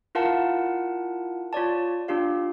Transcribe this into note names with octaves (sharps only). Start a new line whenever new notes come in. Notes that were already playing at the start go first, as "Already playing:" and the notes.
E4 F4 A#4 F5 F#5 A5
F4 C#5 D5 A5
D4 F4 G4 F5